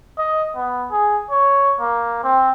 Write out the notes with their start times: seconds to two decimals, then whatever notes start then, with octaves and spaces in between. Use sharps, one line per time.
0.18 D#5
0.55 B3
0.91 G#4
1.30 C#5
1.80 A#3
2.24 C4